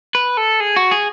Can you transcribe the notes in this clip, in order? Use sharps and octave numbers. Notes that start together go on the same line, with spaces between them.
B4
A4
G#4
F#4
G#4